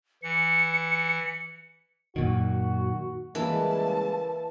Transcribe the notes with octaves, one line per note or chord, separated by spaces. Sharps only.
E3 C#7
F#2 A#2 D#3 F#4
C#3 E3 G3 G#3 A#3 E4 A5